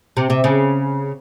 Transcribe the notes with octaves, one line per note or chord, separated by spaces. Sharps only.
C3
C3
C#3